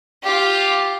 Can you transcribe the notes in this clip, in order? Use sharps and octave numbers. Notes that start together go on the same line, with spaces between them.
F4 G4